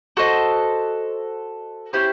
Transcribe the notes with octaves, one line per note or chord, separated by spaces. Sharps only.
F#4 A4 C5 D#5
C#4 E4 G4 C5